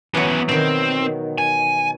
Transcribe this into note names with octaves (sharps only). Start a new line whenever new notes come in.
E3 F#3 B3 C#4
B2 D#3 C4
G#5